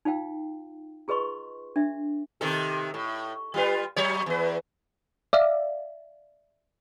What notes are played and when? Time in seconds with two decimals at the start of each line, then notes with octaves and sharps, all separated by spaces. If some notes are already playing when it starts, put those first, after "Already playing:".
0.05 D#4 F4 F5 G5
1.08 F4 G#4 B4 D#5 C6 C#6
1.76 D4 E5
2.41 C3 D#3 A4
2.94 A2
3.54 G3 F4 B4
3.96 F#3 C#5
4.26 E2 B4
5.33 D5 E5 F5